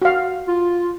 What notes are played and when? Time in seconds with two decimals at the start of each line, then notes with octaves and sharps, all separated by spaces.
0.02 F#4 F5
0.47 F4